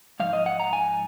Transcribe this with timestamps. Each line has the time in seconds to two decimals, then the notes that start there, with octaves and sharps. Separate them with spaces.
0.20 G#2 F3 F5
0.33 D#5
0.46 F#5
0.60 A#5
0.73 G#5